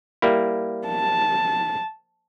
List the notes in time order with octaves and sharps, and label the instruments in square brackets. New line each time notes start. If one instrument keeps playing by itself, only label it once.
[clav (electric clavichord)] G3 A#3 E4
[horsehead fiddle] A5